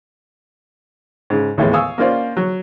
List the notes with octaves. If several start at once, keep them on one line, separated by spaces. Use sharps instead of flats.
G#2 C#3
D#2 A2 E3 G#3 B3
F5 G#5 C#6 D#6 E6
A#3 C#4 F4 C5 D5
F#3